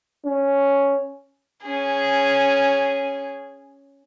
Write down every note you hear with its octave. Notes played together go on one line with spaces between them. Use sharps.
C#4
C#4 G#4